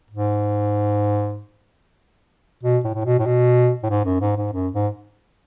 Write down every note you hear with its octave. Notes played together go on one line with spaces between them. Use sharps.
G#2
B2
A2
A2
B2
A2
B2
A2
G#2
F#2
G#2
G#2
F#2
G#2